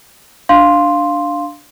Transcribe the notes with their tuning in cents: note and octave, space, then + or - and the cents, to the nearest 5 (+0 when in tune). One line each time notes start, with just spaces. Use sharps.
D4 +0 F5 +0 C6 +0